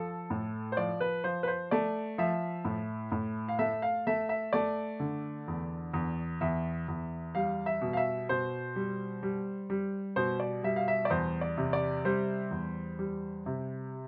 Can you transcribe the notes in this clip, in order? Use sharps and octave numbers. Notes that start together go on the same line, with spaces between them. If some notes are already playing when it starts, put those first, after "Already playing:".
Already playing: F3 A4
A2
C5
F3 D5
B4
F3 C5
B4
C5
A3 D5
F3 E5
A2
A2
F5
A3 E5
F5
A3 E5
E5
A3 D5
D3
E2
E2
E2 E5
E2
G3 F5
E5
B2
F5
E5
B2 C5
G3
G3
G3
B2 C5
D5
G3 E5
F5
E5
D5
E2 C5
D5
C3
D5
G3 C5
E2
G3
C3